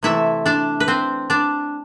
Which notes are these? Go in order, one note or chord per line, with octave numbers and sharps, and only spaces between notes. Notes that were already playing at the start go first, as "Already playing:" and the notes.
C3 E3 A3 E4 E5
D4 D5
B4
C4 C5
D4 D5